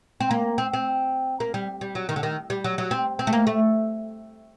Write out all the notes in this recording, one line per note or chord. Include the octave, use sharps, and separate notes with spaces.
C4
A#3
C4
C4
A#3
G3
G3
F#3
D#3
D3
D#3
G3
F#3
F#3
C4
C4
A3
A#3
A3